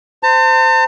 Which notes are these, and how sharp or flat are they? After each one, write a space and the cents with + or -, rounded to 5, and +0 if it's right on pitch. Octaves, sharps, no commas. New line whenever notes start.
C5 -20 A5 +45